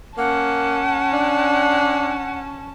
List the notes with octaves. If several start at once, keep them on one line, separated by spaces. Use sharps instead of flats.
A#3 C#4 F#5 A5
D4